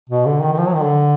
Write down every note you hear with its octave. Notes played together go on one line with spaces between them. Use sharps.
B2
D3
D#3
D#3
F3
F#3
D#3
D3